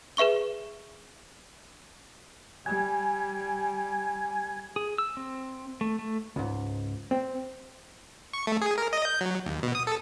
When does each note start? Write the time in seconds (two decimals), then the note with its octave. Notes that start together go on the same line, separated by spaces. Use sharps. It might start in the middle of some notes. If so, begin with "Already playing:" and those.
0.17 G#4 B4 E5 C#6 G7
2.66 G3 G#5
4.76 G#4
4.98 E6
5.17 C4
5.81 A3
5.99 A3
6.36 C#2 G#2
7.11 C4
8.33 C#6
8.47 A3
8.61 G#4
8.78 A#4
8.93 D#5
9.05 G6
9.21 F#3
9.45 D#2
9.63 B2
9.75 D#6
9.87 A4